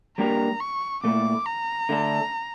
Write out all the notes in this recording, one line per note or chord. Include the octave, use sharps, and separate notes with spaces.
G3 A#3 D4 G4 A#4 A#5
C#6
A#2 A3 E4 D6
A#5
D3 A3 D4 A4